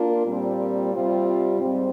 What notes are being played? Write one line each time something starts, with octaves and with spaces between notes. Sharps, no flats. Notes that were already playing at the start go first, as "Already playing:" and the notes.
Already playing: A#3 D4 F4
A#2 G3 C4
C3 G3 C4 F4
G#2 G3 C4